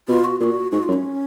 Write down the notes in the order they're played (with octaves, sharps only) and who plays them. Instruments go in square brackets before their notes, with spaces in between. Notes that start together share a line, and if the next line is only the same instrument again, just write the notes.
[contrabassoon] B2 [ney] F4
[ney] F#4
[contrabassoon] A#2 [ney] F#4 G#4
[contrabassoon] G#2 [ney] F#4
[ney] F4
[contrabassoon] F#2
[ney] C#4